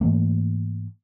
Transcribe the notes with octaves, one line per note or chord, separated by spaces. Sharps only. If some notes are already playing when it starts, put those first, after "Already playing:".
G#2 E3 A3 A#3